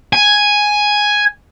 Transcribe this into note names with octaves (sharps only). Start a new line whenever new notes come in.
G#5